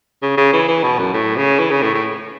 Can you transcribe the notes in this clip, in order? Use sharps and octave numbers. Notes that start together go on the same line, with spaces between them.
C#3
C#3
E3
E3
B2
F#2
A2
C#3
E3
C#3
A2
A2